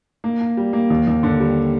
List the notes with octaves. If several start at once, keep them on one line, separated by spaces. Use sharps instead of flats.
A#3
A#3
G3
A#3
D#2
D#2
D3
G3